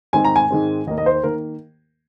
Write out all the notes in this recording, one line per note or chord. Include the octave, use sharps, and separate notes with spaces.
G#2 D#3 G#3 C4 G#5
A#5
G#5
G#2 D#3 G#3 C4
D#2 D#3 A#3 D#5
D#5
C5
D#3 A#3 A#4